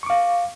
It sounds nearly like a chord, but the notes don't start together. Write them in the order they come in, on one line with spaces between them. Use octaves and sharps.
C#6 D6 F5